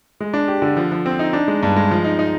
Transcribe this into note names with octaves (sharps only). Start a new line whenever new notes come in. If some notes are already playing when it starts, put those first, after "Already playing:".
G#3
D4
G4
D3
F3
F3
C4
D#4
D4
G#3
G2
G#3
F3
D#4
D#4